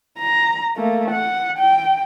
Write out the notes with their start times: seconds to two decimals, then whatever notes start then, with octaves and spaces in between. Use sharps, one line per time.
0.19 A#5
0.76 A3 A#3
1.11 F#5
1.59 G5